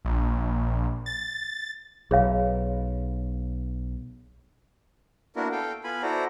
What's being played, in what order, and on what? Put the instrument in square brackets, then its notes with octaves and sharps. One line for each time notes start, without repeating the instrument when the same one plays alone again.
[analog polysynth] A#1
A6
[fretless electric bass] B1 [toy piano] G#4 C#5 F5
[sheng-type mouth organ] A#3 B3 D4 E4 F#4 A#4
A4 F5 G5
B3 F4 G#5 B5
E4 F#4 A4 C5 D5 A#5